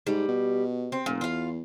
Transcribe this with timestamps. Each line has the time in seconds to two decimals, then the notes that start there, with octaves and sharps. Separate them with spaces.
0.07 G#2 G3
0.28 B2
0.92 C4
1.06 F1 A#2
1.21 E2 F4 F5